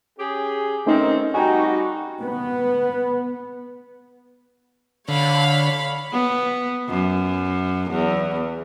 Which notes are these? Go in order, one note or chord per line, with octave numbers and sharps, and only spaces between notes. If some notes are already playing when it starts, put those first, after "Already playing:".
C#4 G4 G#4
D#3 A3 C4 C#4 D#4
G3 D#4 F#4 G5 G#5
B3
D3 C#5 F5 B5
B3
F#2
E2